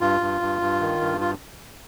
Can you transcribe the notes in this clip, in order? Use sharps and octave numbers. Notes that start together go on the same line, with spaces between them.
G2 F4
G2
G2
G2
D#3
G2
F4